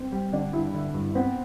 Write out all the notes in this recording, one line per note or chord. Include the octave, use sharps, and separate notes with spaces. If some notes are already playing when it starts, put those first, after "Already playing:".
Already playing: C4
G3
D3 D4
G2 E4
D3
G2
B3 C4